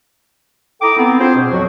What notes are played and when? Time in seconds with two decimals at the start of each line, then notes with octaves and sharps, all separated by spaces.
0.81 E4 A4 G5 A#5 D6 D#6
0.97 B3 C4
1.19 D4 F4 G#4 C5
1.35 B2
1.50 F2 F3 F#3 F#4